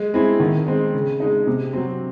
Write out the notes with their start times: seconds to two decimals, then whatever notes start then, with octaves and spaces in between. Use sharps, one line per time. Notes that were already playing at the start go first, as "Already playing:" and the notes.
Already playing: G#3
0.14 C4 E4 G#4
0.40 D#3
0.67 G#3 C4
0.94 C#3
1.20 G#3 D#4
1.47 C3
1.73 F#3 C4